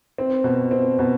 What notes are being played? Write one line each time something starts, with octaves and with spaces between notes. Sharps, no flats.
C4
B2
C4
B2